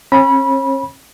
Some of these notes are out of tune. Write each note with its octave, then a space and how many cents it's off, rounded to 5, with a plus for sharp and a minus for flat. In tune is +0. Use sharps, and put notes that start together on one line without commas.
C#4 -45 C#5 -40 B5 -25